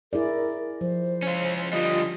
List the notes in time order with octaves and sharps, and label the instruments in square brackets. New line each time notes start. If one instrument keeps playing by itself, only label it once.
[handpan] E4 G#4 D5 [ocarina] A#4
[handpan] F3 [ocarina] C5
[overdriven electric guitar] C#4 F4
[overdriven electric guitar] D3 G3 [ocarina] F4 [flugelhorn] D#5